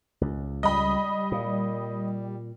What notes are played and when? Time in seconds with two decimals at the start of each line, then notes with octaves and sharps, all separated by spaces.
0.21 C#2
0.63 G3 D#5 B5
1.32 A#2